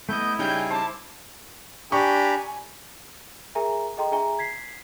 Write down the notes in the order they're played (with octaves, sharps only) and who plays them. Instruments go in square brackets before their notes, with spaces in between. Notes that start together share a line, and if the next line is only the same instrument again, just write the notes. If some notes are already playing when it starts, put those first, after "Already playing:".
[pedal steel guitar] A3 B3 D#5 [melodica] E4 E5 [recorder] G6
[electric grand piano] C#3 G3 D#4 [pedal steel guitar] C#4 G5 G#5 [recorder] G6
[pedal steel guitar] C5 D6 [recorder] A5
[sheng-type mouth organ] D4 A#5 B5 [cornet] G4 [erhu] G#5 [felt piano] C#6
[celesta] G#4 A#4 E5 G#5 A#5
G#4 A4 D#5 G5 A#5 C6
D4 G#4 E5 G#5 A#5 G7
G#6 B6 C7